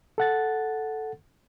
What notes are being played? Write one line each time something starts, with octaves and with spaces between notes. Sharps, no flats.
A4 F#5 A6